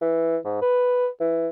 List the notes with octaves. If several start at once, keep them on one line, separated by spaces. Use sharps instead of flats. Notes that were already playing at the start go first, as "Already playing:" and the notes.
E3
G#2
B4
E3